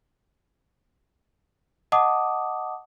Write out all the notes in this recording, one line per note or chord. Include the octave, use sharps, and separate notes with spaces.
D#5 F#5 A5 D6 D#6